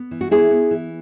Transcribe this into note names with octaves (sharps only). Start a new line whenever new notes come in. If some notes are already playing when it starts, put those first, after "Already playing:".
Already playing: B3
E3
F#4
B3 E4 G#4
B3
E3